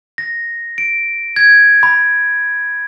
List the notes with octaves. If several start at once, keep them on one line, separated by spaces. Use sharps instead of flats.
A#6
D7
G#6
B5